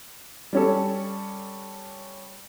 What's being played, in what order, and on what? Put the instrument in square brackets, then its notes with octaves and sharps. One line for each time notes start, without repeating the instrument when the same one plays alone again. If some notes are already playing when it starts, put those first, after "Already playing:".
[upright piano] G3 C#4 A4